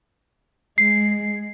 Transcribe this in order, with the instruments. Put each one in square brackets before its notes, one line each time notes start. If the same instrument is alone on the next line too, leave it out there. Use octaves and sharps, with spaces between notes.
[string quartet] G#3 [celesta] C7